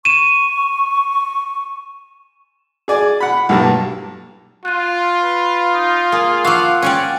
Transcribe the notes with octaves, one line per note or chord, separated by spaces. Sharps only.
C#6 D#7 E7
G#4 D5 G#5
F#5 B5
B1 G2 A#3 A5
F4 F#6 A6 D#7
B4
D#4
A#3 G#4 G#5 D#6
F3 F5 F#5 C#6 D6 E6
C#4 C#5 D5 G5 G#5